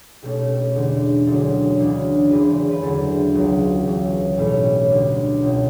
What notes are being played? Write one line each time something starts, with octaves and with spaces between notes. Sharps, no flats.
B1 B2 A3 C#4 G4
E2 D3 A3
E1 D2 D3 F#3 C#4 A4
D2 C#3 E3 B3 D4
E1 E2 C#3 B4
B4
E2 D3 F#3 A4
C#2 C#3 F#3
C#2 C#3 E3
B1 A2 E3 G3 C#4 B4
C#5
B4
D2 D3 G3 D4
C#2 B2 A3 C#4